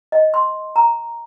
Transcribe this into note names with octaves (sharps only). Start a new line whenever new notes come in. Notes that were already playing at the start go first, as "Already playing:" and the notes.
D#5
C6
A#5